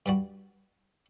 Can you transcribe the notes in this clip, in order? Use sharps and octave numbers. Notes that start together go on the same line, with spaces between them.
G2 G3 F#4